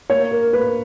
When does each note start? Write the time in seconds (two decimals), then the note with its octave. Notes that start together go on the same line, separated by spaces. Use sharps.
0.10 A#3 C#5
0.31 A#4
0.53 A#3 B4